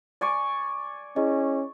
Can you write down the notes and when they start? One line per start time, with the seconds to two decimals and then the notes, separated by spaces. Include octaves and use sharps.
0.21 D5 G#5 C#6
1.16 C#4 E4 G#4 D#5